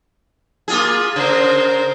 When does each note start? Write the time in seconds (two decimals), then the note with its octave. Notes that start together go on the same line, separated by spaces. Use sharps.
0.68 A#3 F4 G#4
1.16 C#3 A#4 C5